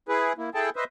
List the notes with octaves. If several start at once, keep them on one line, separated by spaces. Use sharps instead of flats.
E4 G#4 B4
A#3 E4
E4 G#4 A4 G5 A5
B4 C5 D#5 E5